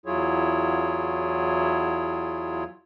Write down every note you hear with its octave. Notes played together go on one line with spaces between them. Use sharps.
E2 F#3 E4 F4 G#4 C#5